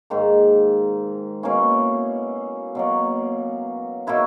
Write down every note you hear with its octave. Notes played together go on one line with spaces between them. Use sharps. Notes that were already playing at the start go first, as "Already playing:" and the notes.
G#2 D#3 A#3
B2 A#3 C#4 E4
B2 F#3 A#3
B2 A#3 E4 B4